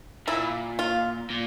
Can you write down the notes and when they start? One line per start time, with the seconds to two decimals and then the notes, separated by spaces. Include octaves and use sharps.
0.27 A#2 E4
0.79 F4
1.30 A#2